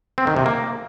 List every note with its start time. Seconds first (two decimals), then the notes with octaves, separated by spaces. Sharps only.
0.18 C4
0.27 D#3
0.36 C3
0.46 A#3